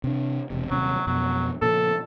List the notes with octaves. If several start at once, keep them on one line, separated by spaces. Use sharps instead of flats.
C3 D4
E1 C3
D#1 C3 F#3 C#4
F2 B2 F#3
A#2 C#3 F3 A4